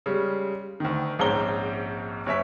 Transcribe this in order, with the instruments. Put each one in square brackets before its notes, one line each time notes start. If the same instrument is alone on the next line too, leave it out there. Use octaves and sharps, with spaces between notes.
[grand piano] C#3 G3 G#3
D2 D#3
A#1 G#2 C4 C#4 A#5 G7
F#1 C#5 E5 B6